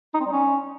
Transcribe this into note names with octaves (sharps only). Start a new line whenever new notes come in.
D#4
C4
G3
C#4